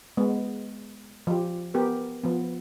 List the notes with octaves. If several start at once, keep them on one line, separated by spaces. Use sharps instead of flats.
G#3 B3
F3 G4
B3 G4 A#4
F3 B3